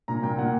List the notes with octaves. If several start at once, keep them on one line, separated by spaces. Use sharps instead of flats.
A#2 A#5
A#2 G5
A#2 F#5